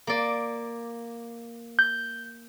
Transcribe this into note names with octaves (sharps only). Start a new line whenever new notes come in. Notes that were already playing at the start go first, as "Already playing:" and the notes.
A#3 D5
G6